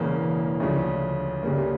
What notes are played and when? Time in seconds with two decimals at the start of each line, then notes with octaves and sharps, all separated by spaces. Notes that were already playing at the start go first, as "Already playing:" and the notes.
Already playing: E1 E2 C#3 E3 A#3
0.60 D2 C#3 F3
1.43 D2 C#3 G3 A#3